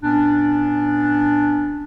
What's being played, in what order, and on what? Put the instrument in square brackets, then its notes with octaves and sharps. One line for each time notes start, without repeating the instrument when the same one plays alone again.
[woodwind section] A#2 B3 C#4 D4